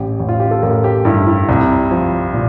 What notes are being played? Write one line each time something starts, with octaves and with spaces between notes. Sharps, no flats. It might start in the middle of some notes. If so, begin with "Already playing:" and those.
Already playing: A1 G4
A1
F4
G4
A4
A1 A#4
G4
G2 E4
E4
C2
F3
A#2